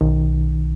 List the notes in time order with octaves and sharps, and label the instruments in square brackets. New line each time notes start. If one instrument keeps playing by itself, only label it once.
[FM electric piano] B1 [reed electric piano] D#3